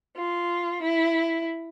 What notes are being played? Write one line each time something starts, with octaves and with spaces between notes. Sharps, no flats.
F4
E4